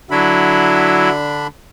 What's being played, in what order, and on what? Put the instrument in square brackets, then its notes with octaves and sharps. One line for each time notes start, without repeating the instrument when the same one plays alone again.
[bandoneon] D3 D4 B5 [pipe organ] F#3 E4